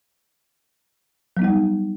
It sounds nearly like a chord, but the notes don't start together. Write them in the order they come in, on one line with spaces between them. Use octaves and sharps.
F#3 B3 D#4 G3